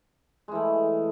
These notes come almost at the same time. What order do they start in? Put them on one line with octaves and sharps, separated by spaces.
G#3 E3 A3